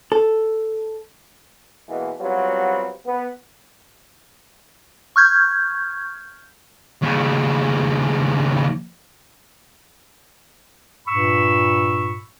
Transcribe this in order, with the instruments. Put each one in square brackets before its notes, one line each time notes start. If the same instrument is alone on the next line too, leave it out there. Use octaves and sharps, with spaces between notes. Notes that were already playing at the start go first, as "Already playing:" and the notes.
[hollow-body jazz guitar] A4
[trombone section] B2 E3 G#3 A#3 B3
F#3 G3 B3 C4 F4
B3
[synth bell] C#6 F6 G6 G#6
[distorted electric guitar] D#2 C#3
[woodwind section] G2 A#2 B5 C#6 E6